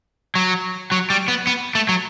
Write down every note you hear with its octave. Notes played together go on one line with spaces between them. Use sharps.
F#3
F#3
G3
B3
B3
A3
F#3